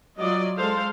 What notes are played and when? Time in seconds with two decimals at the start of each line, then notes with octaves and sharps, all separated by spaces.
0.19 F#3 F4 D5 D#5
0.57 G#3 A4 C5 F5